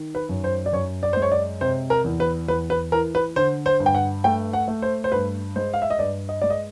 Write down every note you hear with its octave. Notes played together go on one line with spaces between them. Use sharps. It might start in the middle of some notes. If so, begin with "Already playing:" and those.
Already playing: D#3
B4
F#2
C5
D5
F#2 C#5
D5
G#3 C5
C#5
D5
C3 C5
A#4
E2
B4
E2 B4
B4
E3 A#4
B4
D3 C5
C5
G2
G5
F#5
A3 G5
F#5
A3
C5
C5
G2 B4
G#3 C5
F5
E5
D#5
G2 D5
D#5
G#3 D5
D#5